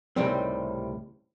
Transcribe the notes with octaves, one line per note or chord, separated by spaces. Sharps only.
C#2 A2 C3 D#3 G3 C4